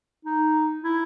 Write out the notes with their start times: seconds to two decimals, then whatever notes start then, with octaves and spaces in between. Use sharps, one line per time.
0.25 D#4
0.84 E4